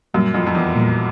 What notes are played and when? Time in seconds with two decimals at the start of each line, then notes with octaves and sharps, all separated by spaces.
0.14 F#2 A#2 G3 A#3
0.34 F2
0.47 F2
0.55 E2
0.75 A#2 G3 A#3